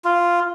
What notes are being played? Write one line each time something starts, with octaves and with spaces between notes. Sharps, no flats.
F4